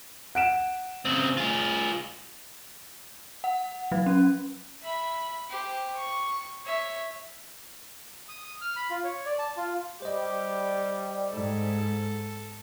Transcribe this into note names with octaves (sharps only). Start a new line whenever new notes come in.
F#5 D7 E7
C#3 C4
F4 G#4
F#5
F#3
C#4
E5 B5
G4 C5
C#6
C#5 E5
D#6
D#6
F6
B5
F4
C#5
D5
A5
F4
G3 G4 C5 D#5
G#2 A4